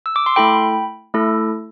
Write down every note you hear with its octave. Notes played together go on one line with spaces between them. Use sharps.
E6
D6
C6
A3 E4 A4 G5 B5
A3 E4 A4